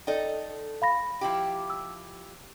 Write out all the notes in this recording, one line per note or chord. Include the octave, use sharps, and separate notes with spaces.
D#4 A4 D5 G5
F5 B5 A#6
F3 E4 G4
E6